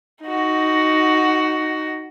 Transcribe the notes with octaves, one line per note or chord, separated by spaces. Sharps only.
D#4 F#4